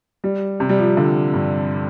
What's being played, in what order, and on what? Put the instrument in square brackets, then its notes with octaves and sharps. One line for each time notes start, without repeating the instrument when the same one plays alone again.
[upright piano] G3
C3
G3
F3
D3
G2